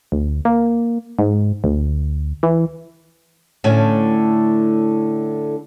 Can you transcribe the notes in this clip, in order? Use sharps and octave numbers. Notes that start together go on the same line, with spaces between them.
D2
A#3
G#2
D2
E3
A2 D3 C#4